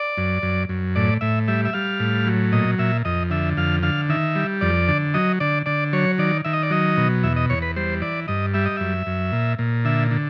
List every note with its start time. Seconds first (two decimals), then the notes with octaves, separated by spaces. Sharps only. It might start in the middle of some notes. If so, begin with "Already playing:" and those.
Already playing: D5
0.17 F#2
0.43 F#2
0.69 F#2
0.96 A2 D5
1.21 A2 E5
1.48 G3 E5
1.65 E5
1.73 G3 F5
2.00 A2
2.27 F#3
2.52 A#2 D#5
2.79 A#2 E5
3.05 F2 D#5
3.30 D3 E5
3.57 F2 F5
3.83 D3 F5
4.09 D#3 E5
4.36 G3
4.61 F2 D5
4.88 D3
5.14 F#3 D#5
5.40 D3 D5
5.66 D3 D5
5.93 F#3 C#5
6.18 D#3 D5
6.45 D#3 E5
6.53 D#5
6.63 D5
6.71 F#3 D#5
6.97 B2
7.24 E2 E5
7.36 D#5
7.50 E2 C#5
7.62 B4
7.76 G3 C5
8.02 E3 D5
8.28 G2 D#5
8.54 G3 E5
8.65 D#5
8.77 F#2 E5
9.07 F#2
9.32 A#2
9.59 A#2
9.85 D3 E5
10.11 D3